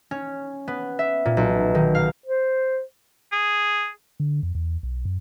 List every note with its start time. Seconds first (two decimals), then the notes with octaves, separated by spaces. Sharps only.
0.11 C#4
0.68 B3
0.99 E5
1.25 A#2
1.37 B1
1.75 D#3
1.95 F5
2.26 C5
3.32 G#4
4.20 D3
4.43 F2
4.55 E2
4.83 B1
5.05 F#2